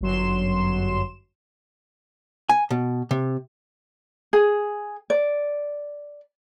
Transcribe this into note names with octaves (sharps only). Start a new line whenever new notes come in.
G1 F#2 F#3 C6 E7
G#5
B2
C3
G#4
D5